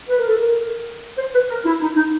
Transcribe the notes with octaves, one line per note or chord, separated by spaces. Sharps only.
B4
A#4
A4
A#4
C5
B4
A#4
E4
D#4
D#4